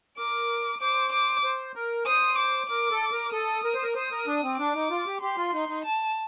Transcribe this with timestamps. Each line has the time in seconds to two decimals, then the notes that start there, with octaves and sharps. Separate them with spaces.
0.18 A#4 D6
0.81 C5 D6
1.12 D6
1.44 C5
1.75 A#4
2.06 C5 D#6
2.38 D6
2.70 A#4 D6
2.91 A4
3.12 A#4
3.32 A4 D#6
3.64 A#4
3.74 C5
3.83 A#4
3.95 C5 D#6
4.12 A#4
4.27 D4
4.43 C4
4.58 D4 D6
4.74 D#4
4.90 F4
5.06 G4
5.21 G4 C6
5.37 F4
5.53 D#4
5.69 D#4
5.84 A5